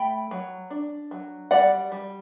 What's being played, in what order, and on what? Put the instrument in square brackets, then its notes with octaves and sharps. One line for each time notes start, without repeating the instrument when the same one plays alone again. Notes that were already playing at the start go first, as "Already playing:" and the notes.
Already playing: [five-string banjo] A3 G5 B5
F#3
D4
F#3
G3 D5 F#5
G3